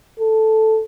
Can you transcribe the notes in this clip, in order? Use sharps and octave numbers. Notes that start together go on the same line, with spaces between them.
A4